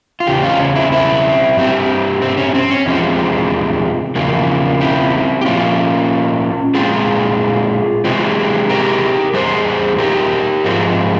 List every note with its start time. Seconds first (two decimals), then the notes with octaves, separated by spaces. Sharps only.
0.20 F4
0.27 E2 C#3 G4
0.43 C#4 F4
0.60 C#4
0.75 C4 E4
0.92 C4 E4
1.56 G2 G3 C4
2.22 C4
2.37 C#4
2.55 C4
2.70 C#4
2.86 E2 C3 F3 G#3 C4
4.15 E2 C#3 F3 A#3
4.80 C4 E4
5.41 G4
5.45 A#2 F3 A#3 C#4 F4
6.75 A#2 G#3 C4 F4 G#4
8.04 C3 E3 G#3 C4
8.70 G4 A#4
9.34 E2 C#3 G3 G#4 C5
9.99 G4 A#4
10.64 G#2 F3 G#3 C4